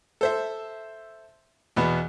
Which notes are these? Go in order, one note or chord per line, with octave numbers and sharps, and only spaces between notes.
A4 C5 E5
E2 B2 B3